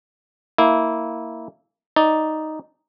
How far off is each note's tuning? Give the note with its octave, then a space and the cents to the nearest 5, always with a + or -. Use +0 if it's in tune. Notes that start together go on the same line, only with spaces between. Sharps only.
A#3 -10 E4 -15
D#4 +0 D5 +0